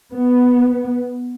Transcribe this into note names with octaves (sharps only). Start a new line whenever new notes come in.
B3